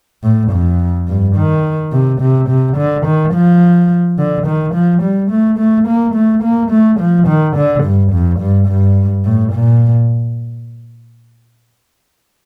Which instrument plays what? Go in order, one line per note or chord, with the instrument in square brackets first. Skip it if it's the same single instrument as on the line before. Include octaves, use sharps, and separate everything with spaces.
[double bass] A2
F2
G2
D#3
C3
C3
C3
D3
D#3
F3
D3
D#3
F3
G3
A3
A3
A#3
A3
A#3
A3
F3
D#3
D3
G2
F2
G2
G2
A2
A#2